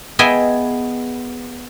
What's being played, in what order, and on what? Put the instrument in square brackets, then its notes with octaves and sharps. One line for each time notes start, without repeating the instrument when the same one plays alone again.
[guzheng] B3 G#4 D#5 E5 G5 G#5